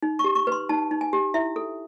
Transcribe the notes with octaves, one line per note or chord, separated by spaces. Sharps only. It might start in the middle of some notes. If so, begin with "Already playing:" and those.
D#4
C#6
G4
C#6
B4 C6
D#4 A5
D#4
G#5
G4
E4 E5
A4